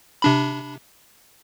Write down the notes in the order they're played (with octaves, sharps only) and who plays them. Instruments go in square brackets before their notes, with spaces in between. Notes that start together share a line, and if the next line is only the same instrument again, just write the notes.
[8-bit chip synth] C3 D4 B5